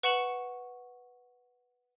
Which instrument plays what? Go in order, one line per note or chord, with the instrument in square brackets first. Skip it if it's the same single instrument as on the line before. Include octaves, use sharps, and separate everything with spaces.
[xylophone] B4 F#5 C#6 C#7 E7 F#7